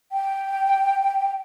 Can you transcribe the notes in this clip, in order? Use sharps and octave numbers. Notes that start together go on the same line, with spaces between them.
G5